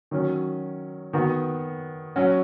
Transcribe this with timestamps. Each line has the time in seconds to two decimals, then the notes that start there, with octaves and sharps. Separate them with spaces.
0.11 D#3 F#3 C#4
1.13 D#3 B3 F#4
2.16 F#3 C#4 F#4